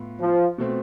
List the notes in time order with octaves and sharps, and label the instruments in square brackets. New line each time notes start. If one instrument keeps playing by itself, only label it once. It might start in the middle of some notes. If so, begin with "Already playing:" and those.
Already playing: [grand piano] A2 B3 F4
[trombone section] F3
[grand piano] B2 A3 C4